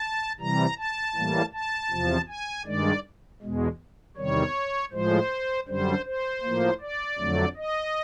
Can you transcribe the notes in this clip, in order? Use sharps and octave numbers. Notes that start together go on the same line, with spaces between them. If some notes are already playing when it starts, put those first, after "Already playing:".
Already playing: A5
C3 E3 G3 A#5
A5
A2 E3 G3 A#3
A5
E2 C3 F3
G#5
G2 D#3 G#3 D5
E2 B2 G#3
E2 C3 D#3 G3 C#5
A2 F3 G#3 C5
F#2 D3 G3 C5
C5
A2 F3 A#3
D5
F2 D3 F#3 A3
D#5